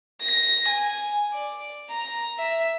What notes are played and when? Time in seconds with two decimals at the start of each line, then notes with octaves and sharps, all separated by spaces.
0.21 A#6
0.68 G#5
1.34 D5
1.91 A#5
2.39 E5